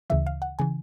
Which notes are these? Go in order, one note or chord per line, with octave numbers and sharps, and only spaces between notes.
D2 C#3 E3 E5
F5
F#5
C#3 E3 G#5